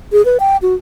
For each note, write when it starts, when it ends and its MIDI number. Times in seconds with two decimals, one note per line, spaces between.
0.12 0.24 68
0.25 0.37 71
0.40 0.57 79
0.62 0.74 66